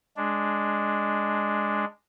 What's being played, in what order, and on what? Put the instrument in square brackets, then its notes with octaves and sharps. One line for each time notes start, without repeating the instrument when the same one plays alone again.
[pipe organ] G#3 D4